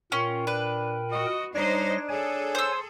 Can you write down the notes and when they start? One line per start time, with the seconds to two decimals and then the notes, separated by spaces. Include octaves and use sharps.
0.12 A#2 C#4 F4 A#4 G5
0.47 D4 B4
1.12 F#4 D#5
1.55 G3 D4 D#4 C5 C#5 D#5 A#6
2.09 G#4 A4 C#5 G#5
2.55 C5 E6